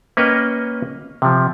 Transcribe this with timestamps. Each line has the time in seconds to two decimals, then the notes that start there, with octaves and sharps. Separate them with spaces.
0.17 A#3 C#4 B4 C#5 D#5 G5
1.22 C3 F3